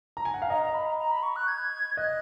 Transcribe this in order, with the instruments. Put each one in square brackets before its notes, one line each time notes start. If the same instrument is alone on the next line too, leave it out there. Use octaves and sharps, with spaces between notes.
[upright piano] A#5
G#5
F#5
F5
[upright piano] D#5 [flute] A#5
[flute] A#5
B5
A#5
A#5
B5
C#6
F#6
G#6
[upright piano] D#5 [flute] F#6